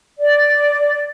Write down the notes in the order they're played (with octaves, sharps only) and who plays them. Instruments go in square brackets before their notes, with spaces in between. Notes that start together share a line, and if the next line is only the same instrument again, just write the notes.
[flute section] D5